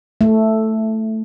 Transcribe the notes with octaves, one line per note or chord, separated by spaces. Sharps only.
A3